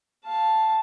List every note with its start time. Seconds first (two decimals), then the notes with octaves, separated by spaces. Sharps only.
0.25 F5 A5